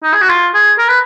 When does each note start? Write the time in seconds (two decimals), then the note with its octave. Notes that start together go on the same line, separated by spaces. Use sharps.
0.03 D#4
0.14 G#4
0.21 F#4
0.29 F4
0.54 G#4
0.79 A#4
0.88 B4